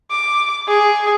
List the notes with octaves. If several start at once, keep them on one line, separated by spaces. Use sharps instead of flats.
D6
G#4